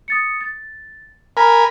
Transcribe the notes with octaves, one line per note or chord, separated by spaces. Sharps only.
D#6 A6 C#7
A6
A#4 G#5 A#5 B5 F6